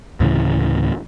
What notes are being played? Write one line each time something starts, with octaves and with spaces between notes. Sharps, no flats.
D2 A2 C#3 E3